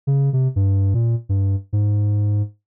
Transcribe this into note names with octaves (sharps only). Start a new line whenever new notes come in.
C#3
C3
G2
A#2
G2
G#2